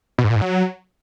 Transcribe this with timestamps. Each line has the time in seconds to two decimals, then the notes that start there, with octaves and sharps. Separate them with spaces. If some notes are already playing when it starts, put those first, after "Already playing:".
0.18 B2
0.24 G#2
0.30 A#2
0.36 G#2
0.41 F#3